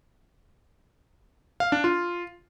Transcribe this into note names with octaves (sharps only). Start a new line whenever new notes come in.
F5
D4
F4